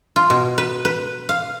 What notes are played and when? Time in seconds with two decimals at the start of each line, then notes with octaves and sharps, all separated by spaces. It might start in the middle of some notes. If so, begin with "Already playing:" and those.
0.16 F4
0.30 B2
0.58 B4
0.85 B4
1.29 F5